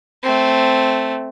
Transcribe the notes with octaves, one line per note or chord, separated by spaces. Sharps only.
A3 C4